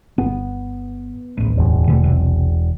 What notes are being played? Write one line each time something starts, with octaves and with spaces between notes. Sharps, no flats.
G1 B3
D1 A1
E1 E2
B2 D3 A3
B1 C3